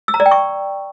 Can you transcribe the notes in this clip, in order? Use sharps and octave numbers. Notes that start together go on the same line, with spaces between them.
E6
A#5
D5
G5
C#6